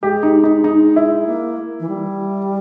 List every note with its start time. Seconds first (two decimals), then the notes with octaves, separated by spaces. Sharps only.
0.02 G#3 G4
0.23 D#4
0.44 D#4
0.64 D#4
0.96 E4
1.27 A#3
1.80 E3
1.89 G3